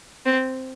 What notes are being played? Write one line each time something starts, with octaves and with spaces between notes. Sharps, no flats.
C4